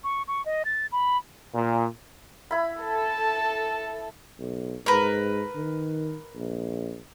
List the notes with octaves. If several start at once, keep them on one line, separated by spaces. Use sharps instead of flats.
C#6
C#6
D#5
A6
B5
A#2
E4 B5
A4 A5
B1
G#2 A#4 B4
D#3
A#1